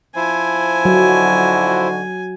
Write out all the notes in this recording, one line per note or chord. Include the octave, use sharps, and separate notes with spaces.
F3 E4 C5 G#5
D3 F#3 D#4 F#4